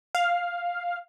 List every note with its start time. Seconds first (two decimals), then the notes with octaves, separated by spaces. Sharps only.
0.15 F5